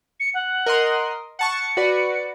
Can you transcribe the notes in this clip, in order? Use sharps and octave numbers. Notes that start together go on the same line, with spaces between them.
C#7
F#5
A#4 D#5 C6
F#5 A5 C#6 C#7
F#4 B4 D5